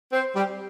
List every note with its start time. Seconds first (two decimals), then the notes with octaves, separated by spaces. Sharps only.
0.13 C4 C5
0.36 G3 G4